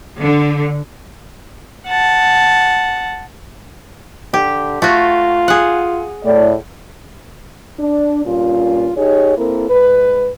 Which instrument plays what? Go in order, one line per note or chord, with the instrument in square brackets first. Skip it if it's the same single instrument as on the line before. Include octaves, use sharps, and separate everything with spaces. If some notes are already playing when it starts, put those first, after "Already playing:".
[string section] D3
[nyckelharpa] F#5 A5
[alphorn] D3 [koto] G4
[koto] A3 F#4 [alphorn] F4
[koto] G#4 F#5
[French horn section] A2 D5
D4
G2 A#2 C#4 F4
D#4 G4 G#4 C#5
A#3 C4 E4 A4 A#4
G#2 B4